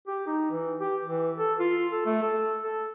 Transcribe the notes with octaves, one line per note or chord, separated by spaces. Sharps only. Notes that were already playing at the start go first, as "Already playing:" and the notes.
G4
D#4
E3
G4
E3
A4
F4
A4
A3
A4
A4